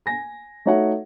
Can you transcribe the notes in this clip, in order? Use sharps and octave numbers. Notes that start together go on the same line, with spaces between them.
G#5 A#6
A3 D#4 F#4 C#5 E5 F#5